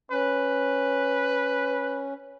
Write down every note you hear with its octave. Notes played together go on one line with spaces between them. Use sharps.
C#4 B4